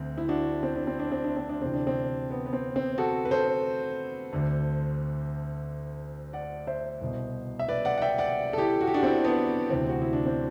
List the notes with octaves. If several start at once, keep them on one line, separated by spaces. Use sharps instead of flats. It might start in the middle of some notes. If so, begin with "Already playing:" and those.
Already playing: D2 D3 C4
E4
D4 F#4
C4
D4
C4
D4
C4
D4
C4
D4
D2 C3 E3 C4
D4
C4
B3
B3
C4
C4
F#4 A4
B4
A4 C5
D2 D3
D5 F#5
C5 E5
C2 B2
E5
B4 D5
D5 F#5
F#5
E5 G5
D5 F#5
A4
E4 G4
F#4
G4
D4 F#4
C4 E4
B3 D4
D2 C3 E3 C4
F#4
E4
D4
C4